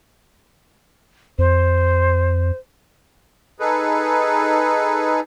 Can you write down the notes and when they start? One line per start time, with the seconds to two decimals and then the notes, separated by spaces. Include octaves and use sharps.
1.39 F2 C5
3.60 D#4 G#4 A4 B4